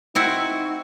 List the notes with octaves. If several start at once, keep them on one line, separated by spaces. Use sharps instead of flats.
C4 D#4 E4 F#4